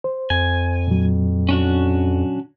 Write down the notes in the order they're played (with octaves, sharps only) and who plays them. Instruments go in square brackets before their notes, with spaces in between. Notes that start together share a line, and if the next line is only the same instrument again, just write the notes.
[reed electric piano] C5
[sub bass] F2 [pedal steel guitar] G#5
[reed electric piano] A#2 F#3
[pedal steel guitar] C#4 D4 F#4